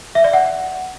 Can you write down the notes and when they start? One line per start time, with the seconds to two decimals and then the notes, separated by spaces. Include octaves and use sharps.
0.15 E5
0.24 D5
0.33 F#5